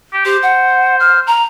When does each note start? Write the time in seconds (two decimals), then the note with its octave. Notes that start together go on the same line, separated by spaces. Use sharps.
0.13 G4
0.25 G4 C5
0.43 F#5
1.00 F6
1.27 A#5